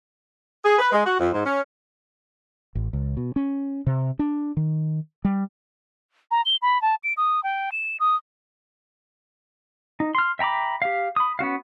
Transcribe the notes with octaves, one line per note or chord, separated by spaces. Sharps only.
G#4
B4
G#3
F#4
F2
G#2
C#4
A1
C#2
B2
C#4
C3
D4
D#3
G3
A#5
G7
B5
A5
D7
D#6
G5
E7
D#6
D#4
C6 F6
E5 G5 A#5 B5 D6
G4 F5
B5 D#6
B3 C#4 F#4 F5